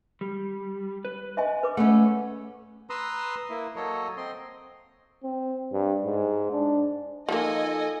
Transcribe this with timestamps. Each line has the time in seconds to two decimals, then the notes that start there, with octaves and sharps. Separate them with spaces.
0.21 G3
1.05 B4
1.37 D#5 E5 G#5
1.63 B4 D6
1.77 A3 B3 C#4 F#5
2.90 B4 A#5 C6 D#6 E6
3.50 A#3 E4
3.76 F#3 A#3 A4 C#5 D#5
4.17 C4 D#5 C6
5.23 C4
5.72 G2
6.05 G#2
6.52 D4
7.29 F3 A#3 D#4 A4 D#5 G#5